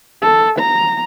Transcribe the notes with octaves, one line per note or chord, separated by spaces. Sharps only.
A4
A#5